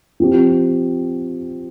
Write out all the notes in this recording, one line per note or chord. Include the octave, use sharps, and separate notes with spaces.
F3 C4 G4